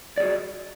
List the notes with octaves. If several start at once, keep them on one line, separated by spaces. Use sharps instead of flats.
F#4 G#4 D5